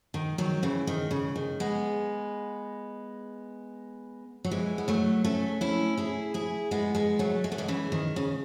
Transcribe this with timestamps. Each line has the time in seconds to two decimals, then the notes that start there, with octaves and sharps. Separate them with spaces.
0.14 D#3
0.38 D#3 F#3
0.63 C#3 E3
0.87 D#3
1.11 C#3
1.36 D#3
1.60 G#3 B3
4.45 F#3
4.51 E3 G#3
4.78 B3
4.88 F#3 A3
5.24 A3 C#4
5.61 C#4 E4
5.97 E4 G#4
6.34 E4 G#4
6.71 G#3 B3
6.95 G#3 B3
7.19 F#3 A3
7.44 G#3
7.52 A3
7.58 E3 G#3
7.68 C#3 E3
7.92 D#3
8.16 C#3